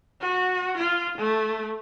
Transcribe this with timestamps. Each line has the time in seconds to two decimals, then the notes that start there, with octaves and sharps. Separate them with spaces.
0.21 F#4
0.78 F4
1.18 A3